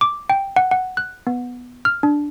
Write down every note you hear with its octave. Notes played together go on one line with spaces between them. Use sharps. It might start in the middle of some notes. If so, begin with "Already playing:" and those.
D6
G5
F#5
F#5
F#6
B3
F6
D4